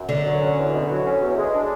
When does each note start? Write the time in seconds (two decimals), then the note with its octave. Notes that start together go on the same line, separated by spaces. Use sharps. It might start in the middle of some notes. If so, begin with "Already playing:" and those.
Already playing: F#2
0.09 B2 D3
0.25 F#3
0.41 C#4
0.58 E2
0.73 B2
0.89 F#3
1.05 C#4
1.21 E2
1.37 G#3
1.53 D4